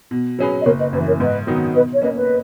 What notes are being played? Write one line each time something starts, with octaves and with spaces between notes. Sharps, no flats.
B2
F#3 C#4 G#4 B4
D#5
F#1 A#4 C#5
B4 D#5
F#2 E3 B4
A#4 C#5
G#2 B4 D#5
D#3 F#3 B3 D#4
B2 B4 D#5
C#5
A#3 C#4 B4 D#5
B4 D#5